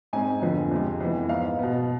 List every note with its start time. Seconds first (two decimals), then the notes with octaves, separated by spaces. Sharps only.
0.13 G#2 G#3 C4 G#5
0.42 F2 D3 F3 B3
0.71 F2 C3 G#3
1.00 F2 E3 B3
1.29 G#2 G#3 B3 F5
1.59 B2 B3